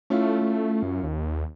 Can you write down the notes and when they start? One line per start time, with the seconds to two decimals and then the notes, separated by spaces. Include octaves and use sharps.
0.10 A3 C#4 E4 F4
0.42 A3
0.83 F#2
1.04 D#2